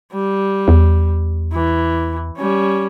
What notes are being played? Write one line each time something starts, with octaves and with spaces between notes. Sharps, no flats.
G3
E2
E3
G3 C#4